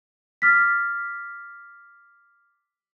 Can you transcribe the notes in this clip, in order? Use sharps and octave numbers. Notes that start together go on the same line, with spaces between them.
D6 F6 A6 B6